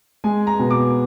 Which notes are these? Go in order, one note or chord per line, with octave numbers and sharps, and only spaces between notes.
G#3 G#5
A#5
B2
D6